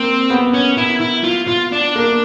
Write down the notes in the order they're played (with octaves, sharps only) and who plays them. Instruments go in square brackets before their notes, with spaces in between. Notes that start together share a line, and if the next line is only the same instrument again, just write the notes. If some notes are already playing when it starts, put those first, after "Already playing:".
Already playing: [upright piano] A#3 [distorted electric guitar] C4
[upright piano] B3
[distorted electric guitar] C#4
E4
E4
F4
F4
D4
[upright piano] A#3